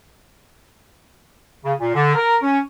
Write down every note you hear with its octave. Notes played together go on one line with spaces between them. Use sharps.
C#3
A#2
D3
A#4
C#4